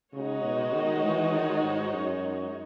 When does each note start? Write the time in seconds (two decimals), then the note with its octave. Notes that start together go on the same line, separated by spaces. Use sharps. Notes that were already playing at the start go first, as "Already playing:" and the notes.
0.13 C#3 G#3 D#4 F#4 C#5
0.44 B2
0.73 D#3
1.04 E3
1.33 D#3
1.64 G#2
1.94 F#2